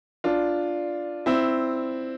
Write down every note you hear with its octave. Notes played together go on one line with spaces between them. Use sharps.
D4 F4
C4 E4